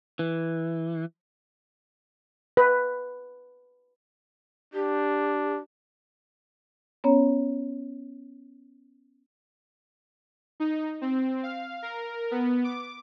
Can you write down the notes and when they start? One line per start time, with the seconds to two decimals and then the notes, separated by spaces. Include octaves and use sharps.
0.19 E3
2.57 B4
4.74 D4 G4
7.04 B3 C#4 C#5 A#5
10.60 D#4
11.01 C4
11.43 F5
11.82 A#4
12.31 B3
12.64 D6